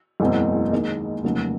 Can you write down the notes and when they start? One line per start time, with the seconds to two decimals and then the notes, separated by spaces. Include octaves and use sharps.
0.20 F#1 E2 B2 G#3 C4
0.73 D#2 D#3 G#3
1.24 F1 D#2 C#3 F#3